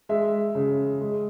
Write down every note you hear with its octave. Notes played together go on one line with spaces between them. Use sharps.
G#3 E5
C#3
G#3